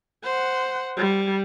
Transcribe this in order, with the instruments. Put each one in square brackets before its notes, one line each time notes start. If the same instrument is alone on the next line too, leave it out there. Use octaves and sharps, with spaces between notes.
[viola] C5 F#5
G3